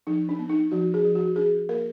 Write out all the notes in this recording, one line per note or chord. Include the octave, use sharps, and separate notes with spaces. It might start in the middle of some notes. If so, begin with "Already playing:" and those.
F3 D#4
D4
B3
D#4
F3 F#4
G#4
F3
F#4
D4 G#4
A#3 A#4